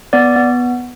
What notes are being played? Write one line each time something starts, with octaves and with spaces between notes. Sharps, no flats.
B3 D5
B3